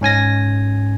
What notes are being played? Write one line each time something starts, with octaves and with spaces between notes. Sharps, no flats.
G#2 C#4 G#5 A#6